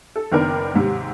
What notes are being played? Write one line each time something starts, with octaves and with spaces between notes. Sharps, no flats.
A4
F#1 D#3 B3 D4 A#4
D#2 G#2 C3